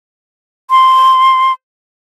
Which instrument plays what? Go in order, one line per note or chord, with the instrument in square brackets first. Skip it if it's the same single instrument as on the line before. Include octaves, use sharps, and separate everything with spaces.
[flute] C6